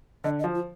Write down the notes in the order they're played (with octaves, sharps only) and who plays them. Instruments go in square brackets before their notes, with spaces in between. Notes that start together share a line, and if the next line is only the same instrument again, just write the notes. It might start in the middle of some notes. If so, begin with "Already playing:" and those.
[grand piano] D3 [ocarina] D#5
[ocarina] D#5
[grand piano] F3
[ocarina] F4